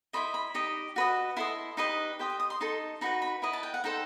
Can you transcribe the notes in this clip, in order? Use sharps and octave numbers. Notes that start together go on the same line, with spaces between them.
E4 A4 C5 D#5 B5
B5
D#4 G4 D#5
F#4 B4 D#5
E4 A4 D#5 C6
D#4 G4 B4 D#5 C6
G4 C5 D#5 G5
G5
D#6
C6
D#4 A4 D#5 C6
D#4 F#4 B4 B5
B5
E4 B4 D#5 B5
A5
G5
F#5
D#4 A4 C5 G5